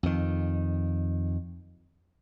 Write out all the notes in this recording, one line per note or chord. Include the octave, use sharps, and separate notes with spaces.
F2 D#3